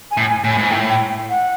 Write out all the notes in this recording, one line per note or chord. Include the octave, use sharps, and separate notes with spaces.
G#5
A2
G#5
A2
G#5
G#2
A2 G5
G5
F#5